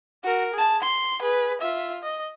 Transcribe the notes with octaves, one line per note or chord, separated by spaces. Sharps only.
F#4 A#4
G#4 A5
C6
G#4 B4
F4 E5
D#5